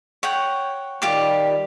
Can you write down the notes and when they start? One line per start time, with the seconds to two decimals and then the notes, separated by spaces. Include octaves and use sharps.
0.23 C#5 F#5 G5
1.02 D#3 G3 F4 G4 D6